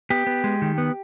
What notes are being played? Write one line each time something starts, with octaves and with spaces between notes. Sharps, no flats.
B3 G4
B3
G#3
D#3
B3